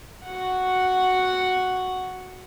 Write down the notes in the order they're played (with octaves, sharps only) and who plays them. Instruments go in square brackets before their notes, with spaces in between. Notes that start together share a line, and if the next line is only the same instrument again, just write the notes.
[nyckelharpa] F#4 F#5